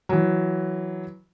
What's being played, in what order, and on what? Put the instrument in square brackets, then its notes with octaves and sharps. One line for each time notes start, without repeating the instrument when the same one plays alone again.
[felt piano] E3 F#3